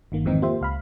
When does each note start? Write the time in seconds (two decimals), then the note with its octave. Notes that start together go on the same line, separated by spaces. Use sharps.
0.12 G1 D#3 A#3
0.25 F2 G#2 D#3 E3 C4 D#4
0.42 A#3 F4 G4 C5 E5
0.61 C#2 F5 B5